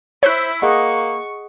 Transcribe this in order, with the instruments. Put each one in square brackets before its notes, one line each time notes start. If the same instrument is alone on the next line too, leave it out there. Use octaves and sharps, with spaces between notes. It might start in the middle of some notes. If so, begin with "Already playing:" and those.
[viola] E4 E5 [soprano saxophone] C5 [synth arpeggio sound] C#5 F#6
[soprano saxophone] A#3 [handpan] G#4 D#5 F#5 [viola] C#6